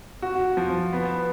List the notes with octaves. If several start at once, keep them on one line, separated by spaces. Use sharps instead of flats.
F#4
F3
B3